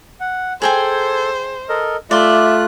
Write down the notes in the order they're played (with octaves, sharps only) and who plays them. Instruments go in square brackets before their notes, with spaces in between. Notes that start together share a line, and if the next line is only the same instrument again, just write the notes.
[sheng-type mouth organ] F#5
[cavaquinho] G#4 G5 G#5 [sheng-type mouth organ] A4 [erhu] C5
[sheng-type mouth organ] A4 A#4 D#5
[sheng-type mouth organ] A3 F4 F#6 [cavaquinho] D5 C6 [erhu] E5